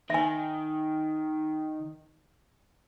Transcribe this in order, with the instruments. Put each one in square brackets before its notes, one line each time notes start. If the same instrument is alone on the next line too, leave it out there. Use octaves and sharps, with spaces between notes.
[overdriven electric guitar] D#3 [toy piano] E5 G#5